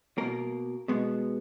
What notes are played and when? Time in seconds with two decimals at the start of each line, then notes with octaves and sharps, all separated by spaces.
0.18 B2 A#3 A#4
0.88 B2 G#3 B3